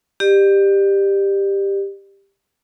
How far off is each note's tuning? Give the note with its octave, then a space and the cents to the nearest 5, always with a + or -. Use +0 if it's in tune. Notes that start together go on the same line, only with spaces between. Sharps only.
G4 +10 D5 +40